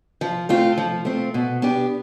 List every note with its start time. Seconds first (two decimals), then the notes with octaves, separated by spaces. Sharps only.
0.21 F3
0.49 A3 C4 F4
0.78 F3
1.05 A3 C4 F4
1.34 B2
1.62 B3 D4 G4